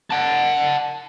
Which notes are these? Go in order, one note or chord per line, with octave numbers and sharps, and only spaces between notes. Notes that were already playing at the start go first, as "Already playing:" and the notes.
F#5 A5